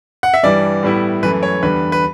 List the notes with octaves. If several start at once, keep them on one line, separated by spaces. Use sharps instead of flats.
F#5
E5
G2 E3 G3 D4 D5
A2 G3 B3 E4
F#2 E3 A3 B4
C#5
E2 D3 G3 B4
B4